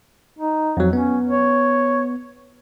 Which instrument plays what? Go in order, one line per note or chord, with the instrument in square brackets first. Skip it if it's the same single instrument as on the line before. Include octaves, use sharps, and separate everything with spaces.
[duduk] D#4
[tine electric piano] F2 F#3
[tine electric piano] B3 [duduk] C#4
[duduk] C#5